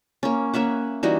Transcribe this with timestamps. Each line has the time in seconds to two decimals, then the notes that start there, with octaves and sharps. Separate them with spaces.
0.23 A#3 C#4
0.54 A#3 C#4 E5 F#5
1.03 E3 G3 D#4 F#4